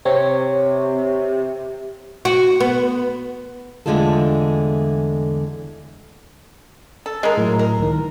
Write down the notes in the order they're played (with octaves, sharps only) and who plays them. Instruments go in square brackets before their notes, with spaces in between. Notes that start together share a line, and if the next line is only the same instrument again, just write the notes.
[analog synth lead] C3 [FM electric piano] C4 C#5
[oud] F#4
B3
[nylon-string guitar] E2 D3 G#3 A3 F4 A4
[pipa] A4
G#3 A#4
[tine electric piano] A2 F#3
[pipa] A#4
[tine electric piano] C#2 D#3